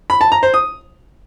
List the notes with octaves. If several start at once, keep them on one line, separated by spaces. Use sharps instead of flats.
B5
A5
A#5
C5
D#6